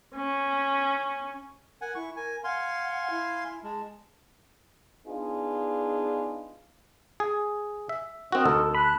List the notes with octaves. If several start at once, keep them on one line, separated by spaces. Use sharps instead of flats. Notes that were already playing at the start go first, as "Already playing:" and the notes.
C#4
A#4 F#5 G#5
E4 C#6
A#4 G#5
F5 F#5 G#5 C6
E4
G#3 A5
B3 D4 D#4 F4 G#4
G#4
E5
C4 D#4 F#4 A#4
D2 A4
A5 B5 F#6